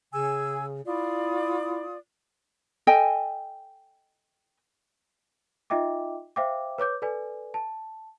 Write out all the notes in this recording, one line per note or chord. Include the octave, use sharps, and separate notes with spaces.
C#3 G#4 G#5 E6
E4 F4 D5 D#6
A4 D#5 G5 G#5
D#4 F4 D#5 E5 G5 D6
C5 E5 F5 G5 D6
B4 C#5 D6 G6
A4 B4 D5 G#5
A5